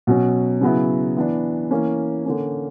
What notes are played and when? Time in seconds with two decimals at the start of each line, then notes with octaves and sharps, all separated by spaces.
0.07 B2 F#3 C#4
0.61 C#3 F#3 B3 E4
1.16 E3 B3 D4
1.71 E3 A#3 C#4
2.26 D3 A#3 C#4